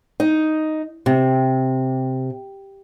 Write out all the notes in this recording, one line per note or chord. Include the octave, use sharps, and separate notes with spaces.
D#4
C3